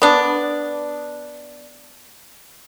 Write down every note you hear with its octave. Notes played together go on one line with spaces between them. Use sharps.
B3 D4